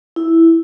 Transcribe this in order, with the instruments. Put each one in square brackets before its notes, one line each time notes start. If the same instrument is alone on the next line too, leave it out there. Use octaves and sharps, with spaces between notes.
[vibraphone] E4